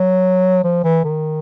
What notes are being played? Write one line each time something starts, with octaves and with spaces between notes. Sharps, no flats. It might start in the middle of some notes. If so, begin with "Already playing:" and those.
Already playing: F#3
F3
E3
D#3